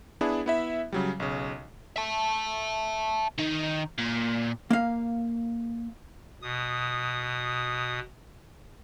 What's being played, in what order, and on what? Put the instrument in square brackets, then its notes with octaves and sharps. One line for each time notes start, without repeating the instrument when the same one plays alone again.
[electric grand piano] B3 D4 E4 G#4
B3 E4 E5
C#3 F#3 G3
B1 C#3
[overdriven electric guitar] E5 A5
D#3 D#4
A#2
[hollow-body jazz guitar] A#3 F5
[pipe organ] B2 D#6